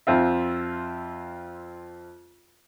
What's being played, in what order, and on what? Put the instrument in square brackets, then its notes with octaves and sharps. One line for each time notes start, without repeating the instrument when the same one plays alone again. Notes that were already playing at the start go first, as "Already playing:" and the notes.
[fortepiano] F2 C4 F4 E5